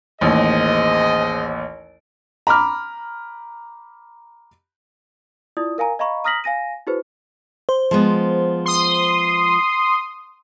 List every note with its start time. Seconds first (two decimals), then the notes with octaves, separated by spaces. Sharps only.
0.21 A1 D#2 G#4 C5 D#5
2.47 A#5 B5 D6 F6
5.57 E4 F4 D5 D#6
5.78 A#4 F5 G#5 A#5
5.99 D#5 F5 A#5 B5 C#6
6.24 A#5 D#6 F6 A#6 B6 F#7
6.44 F5 G#5 A#6 D#7
6.87 E4 F#4 G#4 B4 C5
7.69 C5
7.91 F3 G#3 B3
8.66 C6 D#6